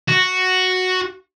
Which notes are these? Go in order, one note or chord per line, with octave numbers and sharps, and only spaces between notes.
F#4